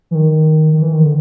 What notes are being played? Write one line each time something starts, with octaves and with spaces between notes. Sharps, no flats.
E3
D#3
D#3
E3
D#3
D3